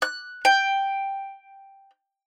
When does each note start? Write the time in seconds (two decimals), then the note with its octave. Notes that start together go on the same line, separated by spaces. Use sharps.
0.02 F#6
0.45 G5